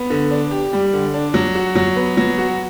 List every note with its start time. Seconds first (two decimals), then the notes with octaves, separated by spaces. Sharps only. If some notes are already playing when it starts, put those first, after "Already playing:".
Already playing: B3
0.10 D3
0.31 D4
0.51 G4
0.73 G3
0.93 D3
1.14 D4
1.34 F#3
1.55 F#4
1.75 F#3
1.96 B3
2.17 F#3
2.38 F#4